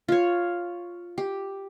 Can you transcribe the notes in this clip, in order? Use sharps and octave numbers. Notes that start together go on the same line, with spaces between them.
F4 C#5
G4